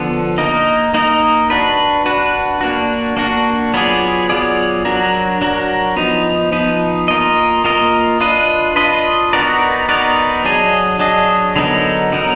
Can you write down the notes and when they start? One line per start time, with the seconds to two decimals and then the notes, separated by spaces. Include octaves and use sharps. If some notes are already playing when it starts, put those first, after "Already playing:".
Already playing: D3 F3 B3
0.38 A#3 D#4 A#4 D#5
0.94 A#3 D#4 A#4 D#5
1.50 D4 F#4 B4
2.06 D4 F#4 B4
2.61 A#3 D4 F#4
3.17 A#3 D4 F#4
3.74 F#3 B3 F4 G#4 D5
4.29 F#3 B3 F4 G#4 D5
4.85 F#3 D4 F#4 A#4
5.41 F#3 D4 F#4 A#4
5.97 F3 B3 D#4
6.52 F3 B3 D#4
7.08 A#3 F4 A#4 D#5
7.64 A#3 F4 A#4 D#5
8.20 D4 F4 B4 D#5
8.76 D4 F4 B4 D#5
9.33 B3 D#4 F#4 A#4 D5
9.89 B3 D#4 F#4 A#4 D5
10.45 F#3 D4 G#4 D#5
10.99 F#3 D4 G#4 D#5
11.56 D3 F#3 B3 D#4 A#4
12.12 D3 F#3 B3 D#4 A#4